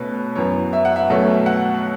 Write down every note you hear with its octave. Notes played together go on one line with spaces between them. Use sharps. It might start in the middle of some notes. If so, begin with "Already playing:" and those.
Already playing: B2 A3 C#4 B4
F#2 E3 B3 C#5
E5
F#5
E5
B2 F#3 A3 C#4
F#5